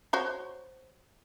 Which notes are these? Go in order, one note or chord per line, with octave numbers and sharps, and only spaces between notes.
F#4 C5 C#5